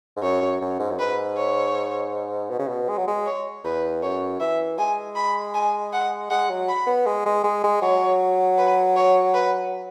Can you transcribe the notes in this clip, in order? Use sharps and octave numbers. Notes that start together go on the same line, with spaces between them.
G#2
F#2 C#5
F#2
F#2
G#2
F#2
G#2 B4
C#5
B2
C#3
B2
G#3
F#3
G#3
C#5
E2 B4
F#2 C#5
E3 E5
G#3 G#5
B5
G#5
F#5
G#3 F#5
F#3
B5
B3
G#3
G#3
G#3
G#3
F#3 C#5
B4
C#5
B4